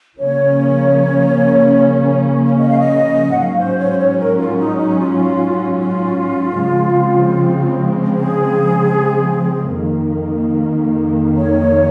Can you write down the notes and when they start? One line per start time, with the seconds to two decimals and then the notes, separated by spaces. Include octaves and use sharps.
0.19 C#3 F3 A#3 C#4 C#5
2.58 D#5
2.69 F5
2.78 D#5
3.31 F#5
3.38 G#2 F#3 C#4 F5
3.58 C5
3.78 C#5
3.90 C5
3.98 C#5
4.17 A#4
4.38 F4
4.58 D#4
4.77 D#4
4.97 F4
5.78 F4
6.57 C#3 F3 G#3 C4
8.17 G#4
9.75 F2 D#3 A#3
11.35 C#5